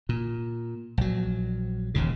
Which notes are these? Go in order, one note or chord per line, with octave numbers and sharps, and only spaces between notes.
A#2
A#1 F#3
E1 D#2 A#2 C#3